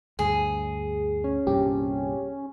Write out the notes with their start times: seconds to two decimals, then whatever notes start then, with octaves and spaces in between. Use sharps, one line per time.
0.19 D2 G2 G#4
1.24 C#4
1.47 C2 G2 A#2 G4